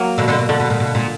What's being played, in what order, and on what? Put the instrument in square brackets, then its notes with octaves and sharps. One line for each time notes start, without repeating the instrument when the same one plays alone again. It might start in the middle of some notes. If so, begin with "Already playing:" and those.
Already playing: [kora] F#3 A#3
[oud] B2 D3
B2 D3
B2
[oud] B2 [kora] D3
[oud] B2
A#2
B2
A#2